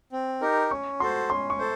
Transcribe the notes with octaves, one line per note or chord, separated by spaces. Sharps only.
C4
D#4 G4 A#4
C#4 C#6
F#4 A4 C5 C6
C#4 C6
C#6
A4 C5